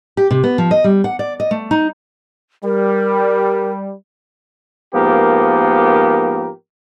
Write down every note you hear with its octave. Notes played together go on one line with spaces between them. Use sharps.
G4
C3
B3
F3
D#5
G3
F#5
D5
D#5
A3
D#4
G3 A#4
G#2 F3 A#3 B3 G4 A#4